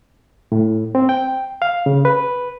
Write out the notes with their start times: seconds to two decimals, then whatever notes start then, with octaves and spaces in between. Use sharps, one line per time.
0.52 A2
0.95 C4
1.09 G5
1.62 F5
1.86 C#3
2.05 B4